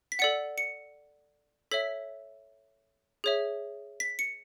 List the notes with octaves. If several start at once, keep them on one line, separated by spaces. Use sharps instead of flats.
B6
A4 D5 F#5 C#7
C#7
A4 C#5 E5 B6
G#4 C#5 E5
B6
C#7